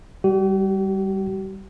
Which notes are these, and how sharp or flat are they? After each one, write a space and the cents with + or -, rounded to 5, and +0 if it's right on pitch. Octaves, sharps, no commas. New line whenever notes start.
G3 +0 G4 -45